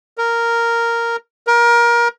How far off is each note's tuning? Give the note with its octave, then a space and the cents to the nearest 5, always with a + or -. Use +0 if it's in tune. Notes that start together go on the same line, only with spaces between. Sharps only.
A#4 -5
A#4 +25